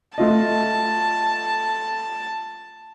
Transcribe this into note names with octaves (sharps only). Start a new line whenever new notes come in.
A3 F4 D#5 A5